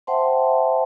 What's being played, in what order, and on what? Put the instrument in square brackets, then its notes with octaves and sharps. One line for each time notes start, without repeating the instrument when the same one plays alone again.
[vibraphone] C5 E5 F#5 G5 A5 C6